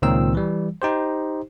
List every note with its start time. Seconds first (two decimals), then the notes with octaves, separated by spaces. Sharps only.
0.02 C#2 A#2 D#3 C4 E6
0.35 E3 G3
0.82 D#4 G4 C5